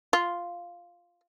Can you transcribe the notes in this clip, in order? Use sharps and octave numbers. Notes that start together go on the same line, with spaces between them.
F4